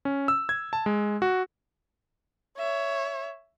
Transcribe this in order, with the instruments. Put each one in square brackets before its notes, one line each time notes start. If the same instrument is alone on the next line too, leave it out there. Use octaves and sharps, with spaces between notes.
[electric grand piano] C#4
E6
G#6
A5
G#3
F#4
[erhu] C#5 [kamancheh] E5